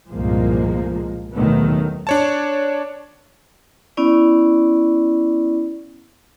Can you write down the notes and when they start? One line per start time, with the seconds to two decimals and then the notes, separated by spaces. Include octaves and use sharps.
0.11 C2 G2 A#2 F3 G#3 A#3
1.32 D#2 B2 D#3 F#3 A3 B3
2.07 D4 C#5 A5
3.97 B3 C#4 E4 D5